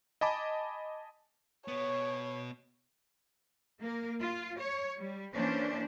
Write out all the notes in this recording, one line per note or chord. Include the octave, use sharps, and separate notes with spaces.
D#5 G#5 A5 B5 D6
B2 B3 C#5
A#3 A#4
F4
C#5
G3
E3 A#3 C#4 D4 C5